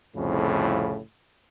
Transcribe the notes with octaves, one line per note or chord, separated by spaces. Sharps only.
C2 F2 A2 C#3